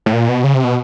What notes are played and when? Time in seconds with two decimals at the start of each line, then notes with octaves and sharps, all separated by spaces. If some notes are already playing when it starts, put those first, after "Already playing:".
0.06 A2
0.13 A#2
0.29 B2
0.44 C#3
0.54 C3
0.64 B2